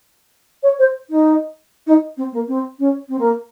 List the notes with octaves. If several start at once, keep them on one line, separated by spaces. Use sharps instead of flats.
C#5
C5
D#4
D#4
C4
A#3
C4
C#4
C4
A#3